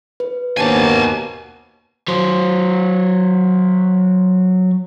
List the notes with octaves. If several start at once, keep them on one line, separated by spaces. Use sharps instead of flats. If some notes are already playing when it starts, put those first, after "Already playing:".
B4
D#2 B2 A#3 D4 C5 C#5 G#5 A5
F#3 C5